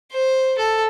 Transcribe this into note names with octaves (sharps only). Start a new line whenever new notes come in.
C5
A4